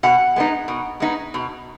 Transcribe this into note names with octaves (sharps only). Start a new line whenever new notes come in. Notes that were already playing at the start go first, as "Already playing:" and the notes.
B2 F#5
G#3 B3 D#4
B2
G#3 B3 D#4
B2